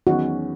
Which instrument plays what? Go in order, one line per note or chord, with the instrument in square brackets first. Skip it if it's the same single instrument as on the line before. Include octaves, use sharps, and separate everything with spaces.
[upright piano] E2 D#3 F#3 C#4 [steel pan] F#4